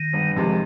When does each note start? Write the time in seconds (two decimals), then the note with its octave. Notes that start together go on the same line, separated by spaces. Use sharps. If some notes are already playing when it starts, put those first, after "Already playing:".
Already playing: D#3
0.13 G1
0.36 F2 C3 D#3 G#3